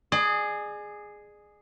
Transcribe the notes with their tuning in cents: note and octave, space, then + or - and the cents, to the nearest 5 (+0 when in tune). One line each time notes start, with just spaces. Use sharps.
G#4 +0 D5 +40